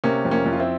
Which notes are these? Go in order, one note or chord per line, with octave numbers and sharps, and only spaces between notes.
C3 A#3 C#4
F2
A#3 C#4
F2
F4
C4 E4